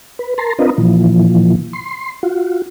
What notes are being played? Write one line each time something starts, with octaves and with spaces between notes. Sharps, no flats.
B4
A#4 A5 A#5 C6
C4 D4 F4 A#4 B4 D#5
A#2 E3 F3
C6
F4 F#4